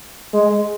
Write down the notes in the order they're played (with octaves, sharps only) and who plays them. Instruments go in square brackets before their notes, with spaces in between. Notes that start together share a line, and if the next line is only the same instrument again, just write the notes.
[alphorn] G#3